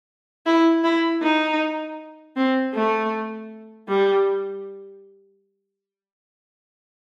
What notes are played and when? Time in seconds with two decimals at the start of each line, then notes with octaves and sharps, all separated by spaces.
0.46 E4
0.84 E4
1.22 D#4
2.36 C4
2.75 A3
3.88 G3